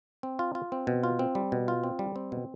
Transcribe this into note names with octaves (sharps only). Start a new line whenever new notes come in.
C4
F4
F4
C4
B2
F4
C4
G3
B2
F4
C4
G3
C4
B2